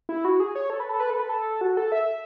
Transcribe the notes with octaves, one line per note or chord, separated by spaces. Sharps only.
E4
F#4
G#4
C#5
A4
B4
A4
B4
A4
B4
A4
F#4
A4
E5